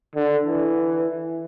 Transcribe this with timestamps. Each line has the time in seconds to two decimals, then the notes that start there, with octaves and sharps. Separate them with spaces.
0.16 D3
0.46 E3